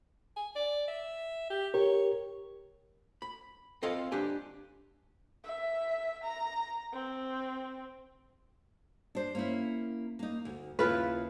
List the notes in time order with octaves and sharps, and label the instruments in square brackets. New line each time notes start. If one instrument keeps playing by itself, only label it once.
[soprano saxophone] G#5
D5
E5
G4
[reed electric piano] G4 A#4 [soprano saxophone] C#5
[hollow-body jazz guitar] B5
C4 F4 A4 D#5 F5 C6
D4 G4 G#5
[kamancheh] E5
A#5
C4
[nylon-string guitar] D4 C5
A#3 C#4 E4
A#3 D#4
D2
[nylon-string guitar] D#2 C#3 E4 [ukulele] F4 B4